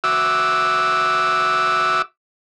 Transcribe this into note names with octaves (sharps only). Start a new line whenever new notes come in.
F#4 E5 D6 E6